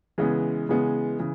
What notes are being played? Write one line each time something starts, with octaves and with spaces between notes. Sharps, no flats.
C#3 E3 G#3 B3
C#3 E3 G#3 B3
C#3 E3